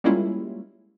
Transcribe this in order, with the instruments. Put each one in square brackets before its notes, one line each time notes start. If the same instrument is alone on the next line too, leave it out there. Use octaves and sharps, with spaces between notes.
[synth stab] G3 G#3 A#3 C#4 E4 F4